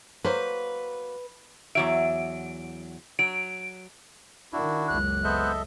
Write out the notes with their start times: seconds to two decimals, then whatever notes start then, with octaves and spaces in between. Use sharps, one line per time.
0.24 F#3 A#3 B4 C5
1.75 E2 F#3 E5 D7
3.19 F#3 D7
4.53 D#3 D4 E4 F#4
4.88 F#1 C#2 F#6
5.24 B3 A4 C5 D#5 E5